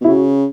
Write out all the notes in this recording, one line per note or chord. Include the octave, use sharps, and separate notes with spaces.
B2
E4
C#3 F#4